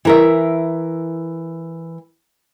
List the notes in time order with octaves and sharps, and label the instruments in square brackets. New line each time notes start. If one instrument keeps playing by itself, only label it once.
[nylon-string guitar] E3 A#4 E5